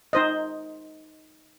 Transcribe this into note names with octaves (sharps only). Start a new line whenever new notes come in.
D#4 C5 D#5